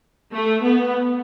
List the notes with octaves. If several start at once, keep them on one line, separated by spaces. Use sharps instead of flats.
A3
B3